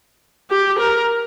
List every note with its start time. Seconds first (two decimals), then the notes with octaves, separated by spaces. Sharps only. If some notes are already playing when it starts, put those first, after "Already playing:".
0.50 G4
0.79 A#4